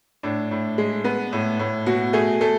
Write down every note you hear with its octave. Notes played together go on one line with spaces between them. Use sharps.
A2 D4
A2
G#3
B3
A2
A2
B2 F#4
A3 G#4
A3 A4